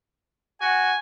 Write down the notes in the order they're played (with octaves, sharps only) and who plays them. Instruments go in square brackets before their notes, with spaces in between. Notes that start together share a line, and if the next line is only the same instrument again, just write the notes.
[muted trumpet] F#4 [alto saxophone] G#5